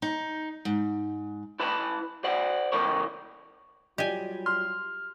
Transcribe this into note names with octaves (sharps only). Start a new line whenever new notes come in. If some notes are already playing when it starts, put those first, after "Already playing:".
D#4
G#2
E4 B4 A5 B5
C5 D5 F#5
C#2 E3 A4 A#4 C#5
F#3 G3 F4 G4 D5 D#5 G#5
C6 F6